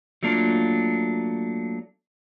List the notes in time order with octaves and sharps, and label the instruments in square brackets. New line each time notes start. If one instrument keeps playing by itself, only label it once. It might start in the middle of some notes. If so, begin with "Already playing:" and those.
[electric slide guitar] F#3 A3 A#3 D4 F4